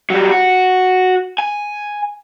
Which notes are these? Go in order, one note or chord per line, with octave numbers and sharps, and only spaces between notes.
F#3 G3
F#4
G#5